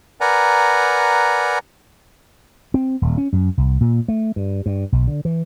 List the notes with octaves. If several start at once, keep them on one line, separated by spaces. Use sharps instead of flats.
A#4 B4 D5 F#5 G#5 A#5
C4
D#1
C#4
F#2
C2
A#2
A3
G2
G2
B1
D3
E3